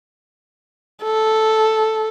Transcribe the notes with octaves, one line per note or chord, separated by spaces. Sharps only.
A4